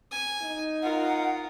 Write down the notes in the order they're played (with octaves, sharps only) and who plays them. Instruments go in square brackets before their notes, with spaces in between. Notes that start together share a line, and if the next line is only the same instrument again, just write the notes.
[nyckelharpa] G#5
[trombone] D#4
[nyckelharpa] F4 A#4 [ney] F#5